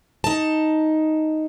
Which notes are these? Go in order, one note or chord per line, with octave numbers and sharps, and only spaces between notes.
D#4 A5